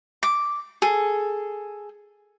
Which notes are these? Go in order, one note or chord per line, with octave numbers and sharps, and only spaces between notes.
D6
G#4 A4